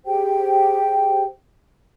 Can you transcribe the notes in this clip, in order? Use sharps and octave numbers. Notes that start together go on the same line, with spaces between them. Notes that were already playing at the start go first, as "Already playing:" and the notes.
G4 G#4 C5 G5